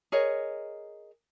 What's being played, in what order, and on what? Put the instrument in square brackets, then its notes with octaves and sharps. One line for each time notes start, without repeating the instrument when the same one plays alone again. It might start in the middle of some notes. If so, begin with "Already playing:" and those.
[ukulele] G#4 A#4 C#5 D#5